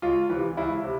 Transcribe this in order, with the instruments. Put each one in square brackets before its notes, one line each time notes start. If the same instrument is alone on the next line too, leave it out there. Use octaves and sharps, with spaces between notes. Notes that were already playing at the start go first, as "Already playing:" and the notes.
[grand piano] C#2 F4
C3 E3
C#2 E4
C3